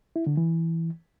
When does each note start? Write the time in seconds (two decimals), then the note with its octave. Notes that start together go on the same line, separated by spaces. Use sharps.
0.16 E4
0.26 D3
0.37 E3